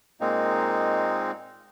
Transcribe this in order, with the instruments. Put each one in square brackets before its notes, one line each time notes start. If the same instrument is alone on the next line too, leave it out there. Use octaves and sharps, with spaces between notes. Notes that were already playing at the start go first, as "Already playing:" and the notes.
[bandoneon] A#2 G#3 A#3 C4 D#4